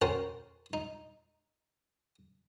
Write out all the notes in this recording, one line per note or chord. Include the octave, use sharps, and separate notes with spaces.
C#4 F#4 A#4 C5 G5 A5
D#4